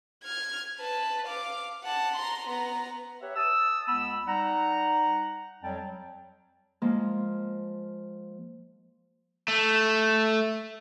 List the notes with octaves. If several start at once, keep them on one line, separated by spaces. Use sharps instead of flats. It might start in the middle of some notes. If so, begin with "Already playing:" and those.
F6 G#6
B4 A5
F5 D6
F#5 A5
A#5 C6
B3 A#5
G4 B4 C#5 E5
A5 D#6 E6
C#2 B3 B5 E6
G3 D#4 F#5 A#5
F2 F#3 G3 G5 A5
F3 G#3 A#3
A3